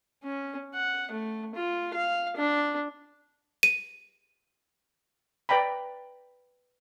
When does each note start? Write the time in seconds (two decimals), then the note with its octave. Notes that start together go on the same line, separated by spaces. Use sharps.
0.24 C#4
0.74 F#5
1.11 A3
1.55 F4
1.94 F5
2.37 D4
3.63 D#7
5.49 B4 D5 G5 A#5 B5